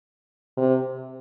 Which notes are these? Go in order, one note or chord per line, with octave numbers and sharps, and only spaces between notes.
C3